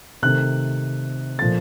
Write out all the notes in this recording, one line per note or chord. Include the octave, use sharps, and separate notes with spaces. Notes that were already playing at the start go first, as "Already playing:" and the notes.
C3 D#3 A3 F#6
A#2 F3 A3 A6